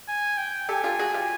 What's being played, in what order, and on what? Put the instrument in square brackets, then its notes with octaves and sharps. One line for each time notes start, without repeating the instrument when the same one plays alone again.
[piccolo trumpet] G#5
G5
[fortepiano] G4 A4 [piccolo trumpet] G#5
[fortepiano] F4 G4
F#4 G#4
F4 G4